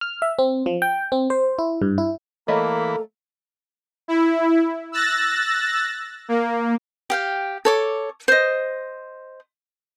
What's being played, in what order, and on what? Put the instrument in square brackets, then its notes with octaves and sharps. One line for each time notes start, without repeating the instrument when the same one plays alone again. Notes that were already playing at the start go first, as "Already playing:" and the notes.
[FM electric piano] F6
E5
C4
F3
G5
C4
C5
E4
G2
E4
[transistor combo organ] E3 B5 [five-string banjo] A3 C#5 D#5 [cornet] A#3 [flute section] A4 A#5
[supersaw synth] E4
E6 F#6 A6 A#6
A#3
[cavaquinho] G4 F5 G5
A4 C#5 D6
C5 D#5